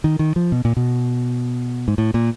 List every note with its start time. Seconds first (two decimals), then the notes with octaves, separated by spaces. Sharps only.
0.04 D#3
0.19 D#3
0.36 F3
0.52 B2
0.65 A#2
0.77 B2
1.88 G#2
1.98 A2
2.14 A#2